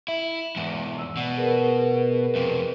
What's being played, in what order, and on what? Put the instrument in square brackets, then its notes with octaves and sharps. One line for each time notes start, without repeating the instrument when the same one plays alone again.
[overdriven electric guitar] E4 [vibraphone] E5
[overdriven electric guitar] E2 G#2
[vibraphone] E6
[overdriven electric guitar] B2 [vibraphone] D5 F#5
[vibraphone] G#4 A#4 B4
[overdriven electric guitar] F2 C3